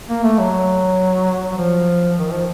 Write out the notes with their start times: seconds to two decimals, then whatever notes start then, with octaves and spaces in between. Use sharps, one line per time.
0.09 A#3
0.24 A3
0.39 F#3
1.52 F#3
1.58 F3
2.17 D#3
2.32 F3